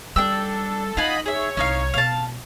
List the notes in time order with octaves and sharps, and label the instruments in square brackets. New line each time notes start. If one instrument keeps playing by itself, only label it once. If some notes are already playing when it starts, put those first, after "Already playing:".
[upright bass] G3 [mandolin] D4 G5 E6 [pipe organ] A4
[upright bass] D#4 [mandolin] F4 F#5 G#5 [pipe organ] D#5 B5
[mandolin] G#4 E5 [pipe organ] C#5
[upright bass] C2 [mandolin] C#4 D#4 F5
[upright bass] B2 [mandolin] F5 A5